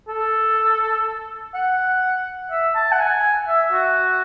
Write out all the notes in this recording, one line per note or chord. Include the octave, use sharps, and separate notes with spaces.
A4
F#5
E5
A5
F#5
G#5
E5
F#4